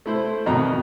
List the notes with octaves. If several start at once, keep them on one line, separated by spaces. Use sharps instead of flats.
A3 E4 C5
F2 B2 D#3 A#5